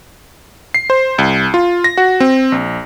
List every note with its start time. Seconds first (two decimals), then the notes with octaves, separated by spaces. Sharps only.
0.74 C7
0.90 C5
1.18 C2
1.54 F4
1.84 A#6
1.97 F#4
2.20 C4
2.52 A#1